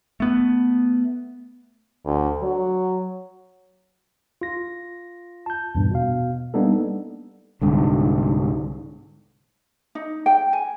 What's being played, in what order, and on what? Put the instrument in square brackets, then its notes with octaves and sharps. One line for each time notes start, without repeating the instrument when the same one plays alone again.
[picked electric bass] A3 B3
[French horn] D2
F#3
[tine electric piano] F4 A#6
A5 G6
E2 G2 A#2
B2 F5
G3 A#3 B3 D4 D#4 A4
[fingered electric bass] C2 G#2 D3
[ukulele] D#4
G5
G#5